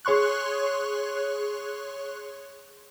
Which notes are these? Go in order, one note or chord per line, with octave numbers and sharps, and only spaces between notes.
G#4 C#5 C6 C#6 F#6